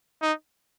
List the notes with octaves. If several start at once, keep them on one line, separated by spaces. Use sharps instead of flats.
D#4